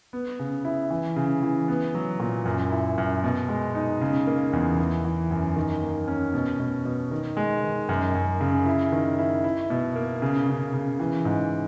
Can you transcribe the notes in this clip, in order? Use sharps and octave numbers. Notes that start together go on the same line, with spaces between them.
B3
C#3
E4
E3
C#3
E3
B3
F#3
A#2
F#2
E4
F#2
B2
G#3
D#4
C#3
A#3
E2
E3
E3
F#2
D#3
A#3
C#4
B2
B2
B2
D#3
G#3
D#3
F#2
F#2
C#3
E4
D#3
E4
E4
B2
A#3
C#3
C#3
C#3
E3
G#2